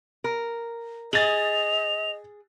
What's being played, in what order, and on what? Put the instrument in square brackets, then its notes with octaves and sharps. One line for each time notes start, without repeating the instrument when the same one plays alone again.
[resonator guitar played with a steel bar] A#4
[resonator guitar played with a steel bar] G#4 [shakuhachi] D#5 [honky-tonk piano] A6 F#7 [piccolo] F7